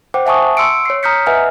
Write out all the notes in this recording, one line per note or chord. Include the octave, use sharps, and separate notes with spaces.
C5 F#5 G5 D6
E5 F#5 G#5 A5 C#6 D#6
C6 E6 C#7 D7
C#5 C7
A#5 D#6 F6 G6 B6 C#7
B4 D#5 E5 F#5 G#5 F6